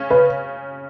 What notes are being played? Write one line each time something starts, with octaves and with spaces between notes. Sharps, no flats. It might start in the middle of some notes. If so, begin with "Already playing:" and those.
Already playing: C#3 C#4
C#3 B4